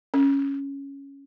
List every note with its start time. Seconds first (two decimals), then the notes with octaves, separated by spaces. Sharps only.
0.14 C#4